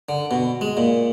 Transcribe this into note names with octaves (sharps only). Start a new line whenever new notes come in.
D3
B2
G#3
A#2